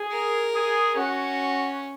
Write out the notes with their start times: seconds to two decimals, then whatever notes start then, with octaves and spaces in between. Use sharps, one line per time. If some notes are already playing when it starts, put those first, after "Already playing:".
Already playing: G#4
0.12 A#4
0.54 G#4
0.96 C#4 F#4